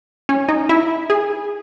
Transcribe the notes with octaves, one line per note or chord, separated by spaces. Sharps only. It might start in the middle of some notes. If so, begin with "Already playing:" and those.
C#4
D#4
E4
G#4